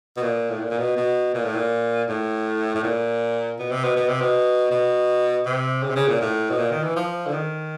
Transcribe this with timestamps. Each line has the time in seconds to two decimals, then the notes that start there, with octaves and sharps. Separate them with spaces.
0.17 B2
0.22 A#2
0.50 A2
0.59 A#2
0.71 A#2
0.78 B2
0.97 B2
1.34 A#2
1.44 A2
1.54 A#2
2.09 A2
2.75 A2
2.84 A#2
3.59 B2
3.71 C3
3.84 B2
3.96 B2
4.09 C3
4.21 B2
4.71 B2
5.46 C3
5.83 C#3
5.90 C3
5.96 C#3
6.08 A#2
6.21 A2
6.50 B2
6.58 A#2
6.71 D#3
6.83 E3
6.96 F3
7.27 D3
7.33 D#3